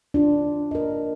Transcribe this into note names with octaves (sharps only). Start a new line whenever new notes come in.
D4 F4
A#4 D#5